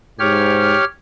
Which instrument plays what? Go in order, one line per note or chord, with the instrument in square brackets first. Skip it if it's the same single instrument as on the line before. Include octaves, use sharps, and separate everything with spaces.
[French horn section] G#2 [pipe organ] G4 C#5 F6